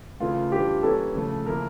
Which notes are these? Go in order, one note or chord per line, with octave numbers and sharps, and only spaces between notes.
C#3 E3 A3 F4
E3 G3 D4 G4
E3 G3 A#3 C#4 E4 A4
C#3 F3 A3
C#3 F3 A#3 E4 A#4